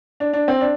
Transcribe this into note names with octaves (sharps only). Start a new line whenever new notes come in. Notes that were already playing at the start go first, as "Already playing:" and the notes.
D4
D4
C4
D4